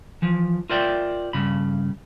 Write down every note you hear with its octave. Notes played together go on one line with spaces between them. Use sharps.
E3 F3
F4 A#4 C5 D5 E5 G5
G2 C#3 B5